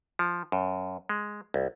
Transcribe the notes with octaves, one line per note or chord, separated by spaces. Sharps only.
F3
F#2
G#3
C2